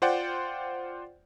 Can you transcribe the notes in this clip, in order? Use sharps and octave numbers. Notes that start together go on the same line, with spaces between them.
F4 C5 D5 F#5 G5